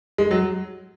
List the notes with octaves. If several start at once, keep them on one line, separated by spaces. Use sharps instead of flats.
G#3
F#3